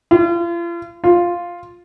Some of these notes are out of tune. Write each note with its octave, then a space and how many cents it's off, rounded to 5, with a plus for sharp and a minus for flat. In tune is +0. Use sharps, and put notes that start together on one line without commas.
F4 -40
F4 +0